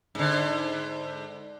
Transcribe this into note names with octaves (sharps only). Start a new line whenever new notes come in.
G#2 D3